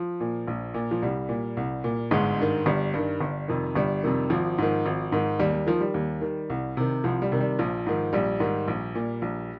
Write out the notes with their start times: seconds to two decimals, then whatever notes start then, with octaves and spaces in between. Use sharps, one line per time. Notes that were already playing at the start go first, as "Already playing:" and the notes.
Already playing: F3
0.20 A#2
0.47 A#1
0.74 A#2
0.91 F3
1.02 C2 G3
1.29 A#2
1.57 C2
1.84 A#2
2.11 G1 G#2 G#3
2.38 G2 D#3
2.66 G1 G3
2.94 G2 D#3
3.21 G1
3.48 F2 C3 D#3
3.75 G1 G3
4.03 F2 C3 D#3
4.30 G#1 F3
4.58 G#2 D#3
4.86 G#1
5.12 G#2 D#3
5.39 D#2 G3
5.54 G3
5.66 D#3 F3
5.81 G3
5.94 D#2
6.21 D#3
6.50 C2
6.77 C3 D#3
7.04 C2 F3
7.22 G3
7.32 C3 D#3
7.41 G3
7.59 A#1 F3
7.86 G#2 D#3
8.13 A#1 G3
8.40 G#2 D#3
8.68 A#1
8.95 A#2
9.22 A#1